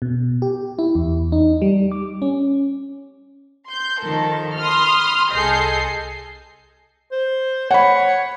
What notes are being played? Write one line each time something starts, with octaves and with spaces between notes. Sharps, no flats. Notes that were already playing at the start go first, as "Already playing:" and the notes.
B2
G4
E4
E2
D#4
G3
D6
C#4
C6 G6
D#3 F3 A4 A#4
B5 C6 D#6 F6
C2 G#4 A4 D#5 G6 C7
C5
C#5 F#5 B5